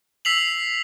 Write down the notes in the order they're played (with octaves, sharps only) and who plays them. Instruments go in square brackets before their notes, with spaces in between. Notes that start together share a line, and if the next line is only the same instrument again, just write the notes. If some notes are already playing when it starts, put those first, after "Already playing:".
[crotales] E6 B6 C7 F7 F#7